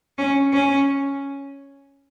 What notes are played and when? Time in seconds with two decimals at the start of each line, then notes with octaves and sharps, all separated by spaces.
0.18 C#4
0.53 C#4